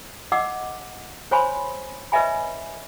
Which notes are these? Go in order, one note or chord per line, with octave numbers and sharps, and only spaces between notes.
D#5 F#5 D6 E6
C5 C#5 G#5 B5 C6
B4 C#5 D#5 E5 G#5 B5